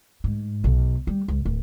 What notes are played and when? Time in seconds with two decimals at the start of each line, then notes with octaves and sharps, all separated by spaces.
0.24 G#2
0.64 B1
1.07 G3
1.28 C#2
1.45 D1